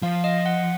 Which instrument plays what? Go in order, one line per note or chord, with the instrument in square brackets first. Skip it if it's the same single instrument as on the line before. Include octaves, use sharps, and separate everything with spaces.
[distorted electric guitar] F3 [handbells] F5
[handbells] D#5
F#5